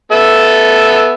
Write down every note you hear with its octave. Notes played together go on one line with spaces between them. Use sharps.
B3 A4 E5